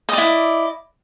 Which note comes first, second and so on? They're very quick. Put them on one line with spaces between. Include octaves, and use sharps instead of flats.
D#5 D5 E4